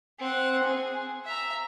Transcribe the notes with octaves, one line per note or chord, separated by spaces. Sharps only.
C4 F#5
G#4
E5 A#5